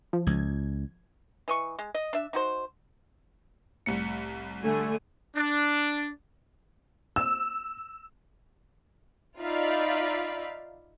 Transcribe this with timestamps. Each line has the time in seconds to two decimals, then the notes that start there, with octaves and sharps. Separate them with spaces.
0.13 F3
0.27 C#2 G#6
1.48 E3 D#5 C#6
1.79 G#3
1.95 D#5
2.13 D4 E5
2.33 D#4 F#4 C5
3.86 C2 A2 C#7
4.63 D3 A3 G#5
5.36 D4
7.16 E6
9.38 D#4 F4 D5 E5 F5 B5